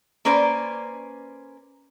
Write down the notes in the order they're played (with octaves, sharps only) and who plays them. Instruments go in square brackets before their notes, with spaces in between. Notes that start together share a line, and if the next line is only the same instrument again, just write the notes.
[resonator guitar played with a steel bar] A#3 C#4 B4 C5 D5